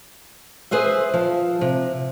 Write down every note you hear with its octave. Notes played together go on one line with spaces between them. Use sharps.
G#4 B4 C5 E5
F3
C3